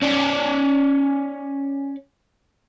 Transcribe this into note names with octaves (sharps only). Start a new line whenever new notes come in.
C#4 D5